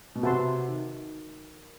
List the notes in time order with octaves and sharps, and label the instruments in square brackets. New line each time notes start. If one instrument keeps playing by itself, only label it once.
[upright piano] B2
[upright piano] C3 [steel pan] F#4 B4 E5 A5 C6
[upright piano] D#3